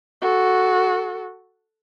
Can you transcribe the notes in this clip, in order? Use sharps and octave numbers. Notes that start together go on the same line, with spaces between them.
F#4 A4